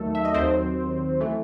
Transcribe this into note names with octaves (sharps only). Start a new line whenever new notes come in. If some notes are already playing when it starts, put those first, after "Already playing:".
Already playing: D#2 D#3 F#3 A3 A4
E5
D#5
D#2 D#3 F#3 C4 C5
E3 A3